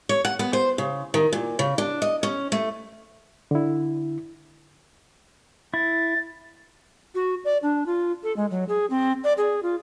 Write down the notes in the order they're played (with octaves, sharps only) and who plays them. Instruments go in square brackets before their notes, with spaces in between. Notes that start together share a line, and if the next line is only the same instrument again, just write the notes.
[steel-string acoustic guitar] C#5
F#5
B3
C5
C#3
D#3
A#2
C#3
D4
D#5
C#4
A3
[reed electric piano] D3 E4
[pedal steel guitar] E4 [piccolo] A6
[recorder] F#4
D5
D4
F4
A4
G#3
F#3
G#4
C4
D5
G#4
F4